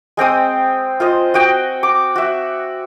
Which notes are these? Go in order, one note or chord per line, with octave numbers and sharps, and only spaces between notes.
G#3 C4 G5 D#6
F4 C5 D#5
F#4 D#5 G5
D6
F#4 E5